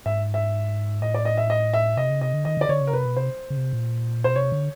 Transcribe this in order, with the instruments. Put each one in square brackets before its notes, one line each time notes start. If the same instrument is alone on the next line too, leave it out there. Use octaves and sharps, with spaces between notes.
[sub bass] G#2 [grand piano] E5
[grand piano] E5
[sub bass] A2 [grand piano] D#5
[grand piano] D5
D#5
E5
D#5
E5
[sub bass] C3 [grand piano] D#5
[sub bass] C#3
[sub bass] C3 [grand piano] D#5
[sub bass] D3
[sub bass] D#3 [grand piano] D#5
[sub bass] D3
[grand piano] D5
[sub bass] D3 [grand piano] C#5
[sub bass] C#3
[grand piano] A#4
[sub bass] C3 [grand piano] B4
[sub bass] B2
[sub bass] C3 [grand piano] C5
[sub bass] C#3
C3
A#2
[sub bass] B2 [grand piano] C5
[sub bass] C3 [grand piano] C#5
[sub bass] D3